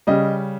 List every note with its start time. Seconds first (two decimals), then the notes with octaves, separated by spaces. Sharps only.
0.07 C#3 G3 D#5